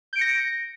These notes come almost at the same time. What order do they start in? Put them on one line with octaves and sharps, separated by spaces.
G6 D7 C#7 A#6